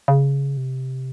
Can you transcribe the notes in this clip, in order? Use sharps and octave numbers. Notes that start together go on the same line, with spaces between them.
C#3
C3